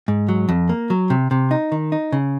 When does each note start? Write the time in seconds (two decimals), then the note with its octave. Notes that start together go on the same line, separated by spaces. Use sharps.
0.08 G#2
0.28 F#3
0.49 F2
0.69 A#3
0.90 F#3
1.10 C3
1.31 C3
1.51 D#4
1.72 D#3
1.92 D#4
2.12 C#3